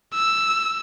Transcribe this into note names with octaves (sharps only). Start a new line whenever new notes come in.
E6